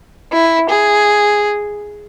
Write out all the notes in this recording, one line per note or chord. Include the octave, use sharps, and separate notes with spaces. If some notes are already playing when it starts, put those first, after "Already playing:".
E4
G#4